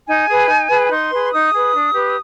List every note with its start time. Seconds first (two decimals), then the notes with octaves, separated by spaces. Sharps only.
0.07 D#4 G#5
0.28 G#4 B4
0.48 D#4
0.70 G#4 B4
0.91 D#4 C6
1.11 G#4 B4
1.32 D#4 D#6
1.53 G#4 B4
1.74 D4
1.94 G4 B4